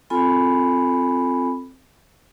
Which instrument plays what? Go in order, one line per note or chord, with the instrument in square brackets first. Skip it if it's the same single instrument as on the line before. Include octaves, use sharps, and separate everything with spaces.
[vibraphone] C4 F4 A4 G#5 B5